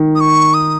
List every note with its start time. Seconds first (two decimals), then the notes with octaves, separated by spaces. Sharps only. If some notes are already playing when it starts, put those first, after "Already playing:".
Already playing: D#3
0.15 D#6
0.21 C#6
0.54 D#6